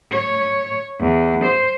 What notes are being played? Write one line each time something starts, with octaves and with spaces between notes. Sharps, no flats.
C#5
E2
C5